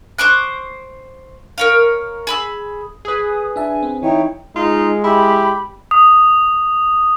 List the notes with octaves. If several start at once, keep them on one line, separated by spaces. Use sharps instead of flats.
C5 C#6 D6 F#6
A#4 C#5 F5
G#4 B5 E6
G#4 B4 D#6
D4 E5 G#5 A5
C4
E3 D#4 E4 C#5 G5
G#3 D#4 F4
E4 G4 B5
D#6